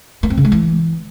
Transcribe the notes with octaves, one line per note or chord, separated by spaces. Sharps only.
A#3
C4
C#3
G#3
E3